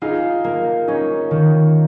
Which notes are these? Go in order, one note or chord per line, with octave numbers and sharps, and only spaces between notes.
D#4 F4 G#4
A#3
C#4 D#4
D#3